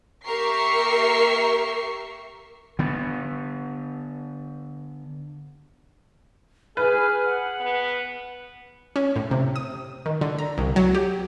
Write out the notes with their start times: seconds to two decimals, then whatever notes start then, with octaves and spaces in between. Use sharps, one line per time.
0.25 A#3 G4 A#4 E5 C#6 C7
2.79 D3 B3
6.77 G#4 B4 F6
7.26 F#5
7.60 B3
8.96 C#4
9.16 A2
9.31 C3
9.56 D#6
10.06 D#3
10.21 D3
10.39 A#5
10.58 C2
10.76 F#3
10.95 G4